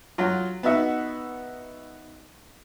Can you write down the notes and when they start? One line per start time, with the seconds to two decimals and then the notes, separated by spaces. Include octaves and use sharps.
0.18 F#3 F4
0.63 B3 D#4 F#4 E5 F#5